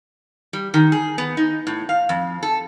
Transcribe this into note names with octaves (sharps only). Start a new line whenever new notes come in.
G3
D#3
G#4
B3
D#4
A2
F5
F2
A4